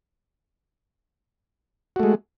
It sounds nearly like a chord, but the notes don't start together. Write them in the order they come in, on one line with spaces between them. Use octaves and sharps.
F#4 A3 G#3